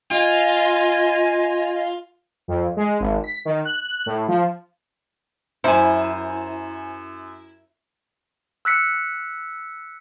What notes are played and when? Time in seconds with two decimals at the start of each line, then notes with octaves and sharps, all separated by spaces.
0.11 F4 D#5 G#5
2.48 F2
2.76 G#3
3.00 G#1
3.24 B6
3.45 D#3
3.65 F#6
4.06 A2
4.28 F3
5.64 F#2 E4 C5 G#5
8.65 E6 F#6 B6 C#7